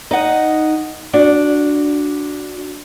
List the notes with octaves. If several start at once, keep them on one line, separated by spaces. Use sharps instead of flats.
D#4 D#5 F#5
D4 F#4